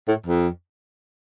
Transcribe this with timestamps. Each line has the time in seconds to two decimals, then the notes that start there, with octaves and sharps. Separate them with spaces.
0.08 A2
0.26 F2